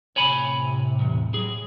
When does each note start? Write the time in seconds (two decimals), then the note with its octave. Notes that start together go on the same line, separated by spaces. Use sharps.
0.16 A2 C3 C#5 G#5 B5
0.99 B1 E2
1.34 F#3 G#4